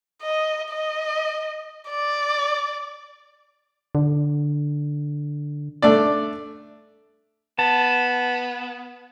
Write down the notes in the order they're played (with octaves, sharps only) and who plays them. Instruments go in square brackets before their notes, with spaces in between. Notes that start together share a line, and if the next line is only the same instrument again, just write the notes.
[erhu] D#5
D#5
D5
[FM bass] D3
[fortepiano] A3 D4 D5
[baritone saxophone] B3 [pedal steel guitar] A5